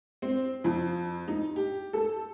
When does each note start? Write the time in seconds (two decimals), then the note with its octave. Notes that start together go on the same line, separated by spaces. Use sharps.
0.22 C4
0.64 F2
1.28 D#4
1.56 G4
1.93 A4